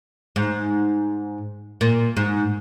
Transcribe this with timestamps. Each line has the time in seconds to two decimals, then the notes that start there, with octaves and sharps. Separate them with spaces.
0.36 G#2
1.81 A#2
2.17 G#2